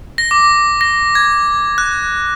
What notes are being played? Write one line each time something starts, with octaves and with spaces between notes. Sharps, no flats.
A#6
D6
A#6
G#6
F#6